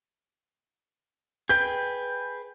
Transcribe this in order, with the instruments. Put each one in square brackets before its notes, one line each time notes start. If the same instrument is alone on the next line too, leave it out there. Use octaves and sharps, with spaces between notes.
[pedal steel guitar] G#4 B4 G5 [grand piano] G6